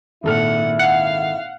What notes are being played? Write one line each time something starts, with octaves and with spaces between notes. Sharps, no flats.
G#1 A#2 E4 A4 F#5 F6
F5 F#5